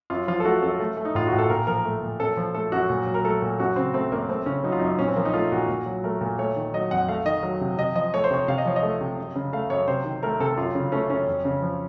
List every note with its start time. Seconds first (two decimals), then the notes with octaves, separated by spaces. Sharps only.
0.10 F#2 F4
0.28 F3 F4
0.40 A4
0.45 A3 F#4
0.62 F#2 A4
0.80 A3
0.97 A3
1.05 D#4
1.15 A2 F4
1.27 F#4
1.32 A2
1.38 A4
1.49 A#2 A#4
1.67 F3 A#4
1.85 A3
2.02 A#2
2.19 F#2 A4
2.37 F3
2.55 A3 A4
2.72 F#2 F#4
2.90 A#2
3.06 F#3
3.14 A#4
3.24 A3 A4
3.42 A#2
3.59 F#2 F#4
3.76 C#3 C4
3.94 A3 C4
4.12 F#2 A#3
4.29 A3 C4
4.46 C#3 C#4
4.64 F#3 D#4
4.72 F4
4.79 F#2 D#4
4.99 A#2 C#4
5.08 C4
5.16 F3 A#3
5.25 D#4
5.34 A3 F4
5.52 A#2 F#4
5.68 A#2
5.86 F#3
6.04 A3 A#4
6.21 A#2
6.38 A3 C#5
6.56 D#3
6.74 F#3 D#5
6.91 F2 F#5
7.09 A3 F5
7.25 D#3 D#5
7.43 F#3
7.61 C3
7.78 C3 D#5
7.95 F3 D#5
8.14 A3 C#5
8.24 C5
8.31 C3 C#5
8.48 C3 F5
8.58 D#5
8.65 F3 C#5
8.76 D#5
8.83 A3
9.01 C3
9.18 F#2
9.36 C#3
9.53 A3 F5
9.70 F#2 C#5
9.88 C3 C5
10.05 D#3
10.23 A3 A#4
10.40 C3 A4
10.57 F#2 F4
10.75 C#3
10.92 A3 C#4
11.10 F#2 C#4
11.27 F2
11.45 C#3
11.62 F3